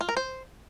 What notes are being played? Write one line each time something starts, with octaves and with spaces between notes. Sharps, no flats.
F4
A#4
C5